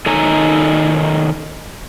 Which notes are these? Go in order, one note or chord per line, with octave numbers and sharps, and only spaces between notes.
D#3 D#4 A4 C#5 G#5 A#5